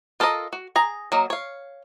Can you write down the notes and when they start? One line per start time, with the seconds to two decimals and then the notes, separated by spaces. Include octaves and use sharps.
0.20 F4 A4 A#4 C5 D#5
0.53 F#4
0.76 G#4 A#5
1.12 F#3 A#3 D#5
1.30 C#5 F5